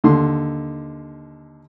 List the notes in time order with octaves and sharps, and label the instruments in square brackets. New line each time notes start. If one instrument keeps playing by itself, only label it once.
[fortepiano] D#2 D3 C6